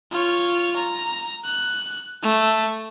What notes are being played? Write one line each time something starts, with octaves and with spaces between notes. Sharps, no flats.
F4 C#5
A#5
F#6
A3